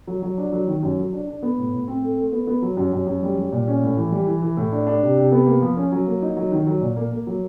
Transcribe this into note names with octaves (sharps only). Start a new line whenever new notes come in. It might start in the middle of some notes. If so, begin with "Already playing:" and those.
F#3
F#3
D4
F#3
D#3
F#2
F#3
D4
D4
B3
A2
A2
C4
A3
A3
B3
B3
F#3
F#2
F#2
F#2
G3
G3
A#2
C#4
A2
E3
G3
E3
E3
A2
D4
D4
C3
C3
B3
A#3
F3
C#4
F#3
A#3
D#4
F#3
D#3
F#3
A#2
A#3
A#3
F#3